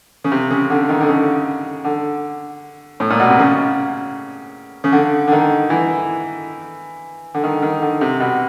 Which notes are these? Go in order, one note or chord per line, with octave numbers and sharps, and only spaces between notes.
C#3
C3
C#3
D3
D#3
D3
C#3
D3
A2
A#2
B2
C3
C#3
C#3
D3
D3
D#3
E3
D3
D#3
D#3
D3
C3
B2